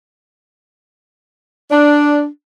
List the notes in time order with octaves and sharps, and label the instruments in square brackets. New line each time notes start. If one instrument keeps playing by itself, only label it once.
[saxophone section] D4